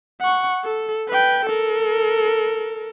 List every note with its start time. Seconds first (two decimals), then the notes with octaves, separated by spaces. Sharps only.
0.21 F#5 C#6
0.65 A4
1.09 B4 G5
1.45 A4 A#4